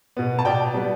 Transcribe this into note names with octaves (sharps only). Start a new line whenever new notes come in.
B2 B3
A5
B2 D5 G5
G3 B3